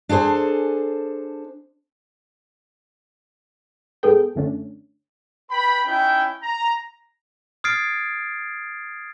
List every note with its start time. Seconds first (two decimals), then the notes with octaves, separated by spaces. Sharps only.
0.09 D4 G#4 A4 C5 G#5
4.03 G#2 B3 G#4 A4 G5
4.35 F#2 D3 A3 C#4 D4
5.51 B4 G5 B5
5.86 C#4 D#4 E4 G5
6.43 A#5
7.64 D#6 F6 G#6 A6 C7 D7